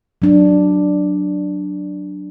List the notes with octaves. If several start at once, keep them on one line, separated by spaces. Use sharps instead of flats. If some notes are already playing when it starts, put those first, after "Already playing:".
F#3 D4